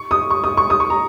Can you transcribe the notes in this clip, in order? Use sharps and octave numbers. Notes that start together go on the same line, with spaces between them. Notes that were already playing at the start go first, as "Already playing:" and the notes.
Already playing: C#6
D#6
C#6
D#6
C#6
D#6
C#6
A#5